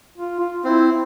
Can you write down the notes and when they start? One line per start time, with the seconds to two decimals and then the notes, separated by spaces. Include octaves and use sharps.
0.18 F4
0.40 F4
0.64 C4 E4